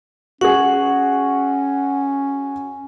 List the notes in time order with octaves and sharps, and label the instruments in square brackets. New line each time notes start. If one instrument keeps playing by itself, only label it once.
[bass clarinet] C#4 [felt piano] F#4 G#4 [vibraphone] F#5